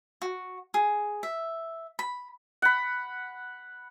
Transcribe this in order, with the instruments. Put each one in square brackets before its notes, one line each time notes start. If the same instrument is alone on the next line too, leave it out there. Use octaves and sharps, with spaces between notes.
[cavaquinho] F#4
G#4
E5
B5
[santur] F#5 B5